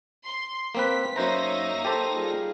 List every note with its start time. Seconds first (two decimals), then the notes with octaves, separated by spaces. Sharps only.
0.25 C6
0.75 A#3 C4 B4 B6
1.16 F#2 A#3 D#4 C5 C#5 E5 A#5 A#6
1.85 G4 A4 C5
2.15 G3 F4 G#4